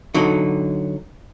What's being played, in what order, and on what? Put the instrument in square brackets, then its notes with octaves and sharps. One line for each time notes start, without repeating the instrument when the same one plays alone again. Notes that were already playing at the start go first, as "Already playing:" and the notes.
[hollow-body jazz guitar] D3 F#3 D#4